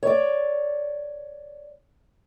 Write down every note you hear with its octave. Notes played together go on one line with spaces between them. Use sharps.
C#5 D5